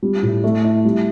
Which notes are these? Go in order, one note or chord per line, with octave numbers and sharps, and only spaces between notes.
G3
A2
A3
E4
G3